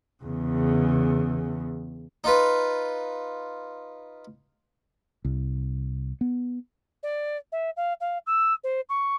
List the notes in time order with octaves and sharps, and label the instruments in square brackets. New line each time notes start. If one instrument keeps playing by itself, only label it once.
[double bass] E2 C#3
[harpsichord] D#4 F4 B4
[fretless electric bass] C2
B3
[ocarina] D5
E5
F5
F5
E6
C5
C#6